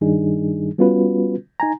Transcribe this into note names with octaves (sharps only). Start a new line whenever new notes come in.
G2 D#3 G3 D4 D#4 G#4
G3 B3 C#4 F4 F#4 B4
D#4 G#5 A#5